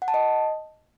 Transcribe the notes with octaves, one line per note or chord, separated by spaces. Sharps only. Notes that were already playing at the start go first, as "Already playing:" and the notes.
F#5
A5
D#5